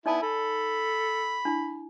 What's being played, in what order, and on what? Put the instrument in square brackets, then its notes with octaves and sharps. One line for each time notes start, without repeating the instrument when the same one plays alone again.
[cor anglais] B3 [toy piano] D#4 D5 A5 [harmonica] E4
[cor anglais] A4 [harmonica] B5
[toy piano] D4 E4